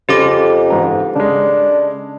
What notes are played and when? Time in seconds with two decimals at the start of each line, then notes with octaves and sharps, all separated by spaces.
0.09 F2 C#3 G4 A4 D6
0.70 G#2 E3 A#5
1.15 C#3 G#3 D4